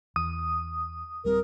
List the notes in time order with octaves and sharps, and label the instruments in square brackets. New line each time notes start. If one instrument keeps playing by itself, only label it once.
[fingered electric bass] E2 [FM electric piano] D#6
[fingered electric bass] D1 G3 C4 [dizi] A#4